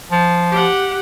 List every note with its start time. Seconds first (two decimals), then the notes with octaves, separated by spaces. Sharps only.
0.11 F3
0.51 G4 F#5